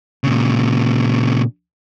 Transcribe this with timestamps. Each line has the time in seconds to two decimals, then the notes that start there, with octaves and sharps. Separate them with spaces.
0.24 A#2 C#3